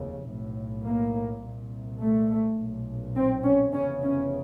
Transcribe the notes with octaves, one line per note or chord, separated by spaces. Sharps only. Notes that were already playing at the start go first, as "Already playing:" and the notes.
Already playing: F1 D#2 C#3
B1 A2
A#3
C2 A#2
A3
B1 A#2
C4
C#4
F1 E2 C#3 C#4
C#4